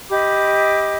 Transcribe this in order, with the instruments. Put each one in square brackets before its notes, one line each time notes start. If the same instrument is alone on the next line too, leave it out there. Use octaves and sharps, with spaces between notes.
[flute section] G4 D#5 B5 D6